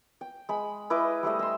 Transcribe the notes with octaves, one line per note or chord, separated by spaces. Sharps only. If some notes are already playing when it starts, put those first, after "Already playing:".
G5
G#3 B5
E4 B4 D#5 D6
G3 A3 C5 D#5
E5 C6